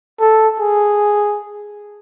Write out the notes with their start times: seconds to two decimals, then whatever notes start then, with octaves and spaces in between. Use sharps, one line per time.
0.20 A4
0.60 G#4